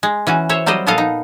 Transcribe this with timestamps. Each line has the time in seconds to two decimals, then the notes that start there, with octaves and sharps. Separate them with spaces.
0.03 G#3
0.27 E3 C#4 F#4
0.49 C5 C#5 E5
0.66 F#3 G3 C4 C5 D#5
0.86 A#2 F3 B3 A4 D#5 F5
0.98 D#4